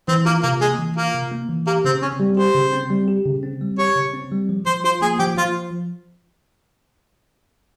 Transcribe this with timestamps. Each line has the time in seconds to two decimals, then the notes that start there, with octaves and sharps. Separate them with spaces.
0.08 E3 C4
0.25 A#3 F4
0.43 C3 A#3
0.61 G#3 A#3
0.79 E3
0.97 A#3 F4
1.14 C3
1.32 A#3
1.49 E3
1.67 A#3 G4
1.85 C#3 C4
2.02 C4 C#4
2.20 G3
2.37 G4 C5
2.55 C#3
2.73 C4
2.90 G3
3.08 G4
3.26 C#3
3.43 C4
3.61 G3
3.78 G4 C#5
3.96 C#3
4.14 C4
4.32 G3
4.49 F3
4.66 F3 C5
4.84 F4 C5
5.02 A#3 G#4
5.19 F3 G4
5.37 F3 F4